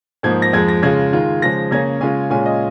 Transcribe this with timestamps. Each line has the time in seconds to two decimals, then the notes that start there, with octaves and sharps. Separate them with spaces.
0.23 G#2 F3 A#3 D#4 G#6
0.42 A#6
0.53 F2 F3 G#3 G#6
0.68 A#6
0.83 C#3 G#3 F4 G#6
1.13 D#3 G#3 F4
1.42 C#3 F3 G#3 A#6
1.71 C#3 A#3 C#4 G#6
2.01 C#3 G#3 C#4 F4 G#5
2.30 A#2 G#3 C#4 F4 G#5
2.46 D#5